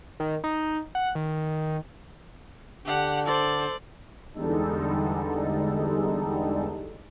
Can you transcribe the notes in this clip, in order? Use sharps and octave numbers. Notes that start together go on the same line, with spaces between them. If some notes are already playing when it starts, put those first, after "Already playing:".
D#3
D#4
F#5
D#3
D3 D4 G4 F#5
A4 C5 D5
E2 D3 G3 G#3 D#4 A4